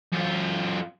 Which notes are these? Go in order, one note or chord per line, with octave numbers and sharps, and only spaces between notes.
F#2 F4